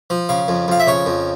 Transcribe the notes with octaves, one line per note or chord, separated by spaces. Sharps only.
F3
C#3 F5
F2
F2 F5
E5
C#3 C#5
F2